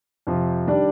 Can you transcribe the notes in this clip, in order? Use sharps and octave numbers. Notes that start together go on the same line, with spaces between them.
F2 C3 F3
D#3 G3 D4 G4 D5